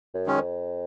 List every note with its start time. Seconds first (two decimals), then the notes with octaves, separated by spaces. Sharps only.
0.14 F#2
0.26 D#3 G#3 C#4
0.38 F2